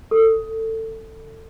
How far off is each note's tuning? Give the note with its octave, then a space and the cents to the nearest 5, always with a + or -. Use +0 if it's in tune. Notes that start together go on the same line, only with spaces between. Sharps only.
A4 +20